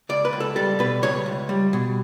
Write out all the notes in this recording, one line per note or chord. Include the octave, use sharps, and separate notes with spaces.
C#2 D5
B4
C#2
A4
G3 A4
B2 B4
C#2 C#5
C#2
G3
B2